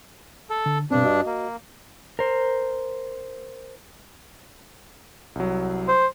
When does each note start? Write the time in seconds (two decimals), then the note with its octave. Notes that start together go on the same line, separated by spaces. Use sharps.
0.50 A4
0.66 D3
0.91 G2 B2 C4 D4
1.04 F#4 D#5
1.26 A#3
2.19 A#4 C5
5.35 C2 F#3
5.88 C5